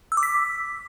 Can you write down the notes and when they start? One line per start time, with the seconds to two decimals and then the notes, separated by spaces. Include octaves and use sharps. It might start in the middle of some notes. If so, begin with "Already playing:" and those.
0.12 E6
0.17 D6
0.23 B6